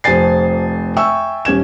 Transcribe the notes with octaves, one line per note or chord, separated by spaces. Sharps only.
F1 F2 C5 G#5 A6 C7
E5 G5 G#5 C#6 E6
D#1 C#4 G#6 E7